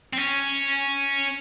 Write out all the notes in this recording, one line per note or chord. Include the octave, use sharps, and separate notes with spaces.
C4
C#4